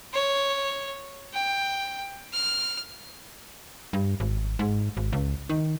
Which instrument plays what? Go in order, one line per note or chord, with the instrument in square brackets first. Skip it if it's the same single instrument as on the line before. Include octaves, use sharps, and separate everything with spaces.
[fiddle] C#5
G5
F6
[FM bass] G2
G#1
G#2
G#1
C#2
D#3